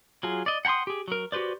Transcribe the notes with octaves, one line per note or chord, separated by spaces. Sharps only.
F#3 F4 G#4
D5 D#5
F#5 G5 A#5 C6 D#6
G4 G#4
F#3 A#4
F#4 G4 B4 C5 D5